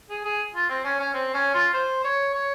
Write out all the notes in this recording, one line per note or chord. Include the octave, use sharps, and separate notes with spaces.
G#4
G#4
F4
C4
C#4
C#4
C4
C#4
F4
C5
C#5
C#5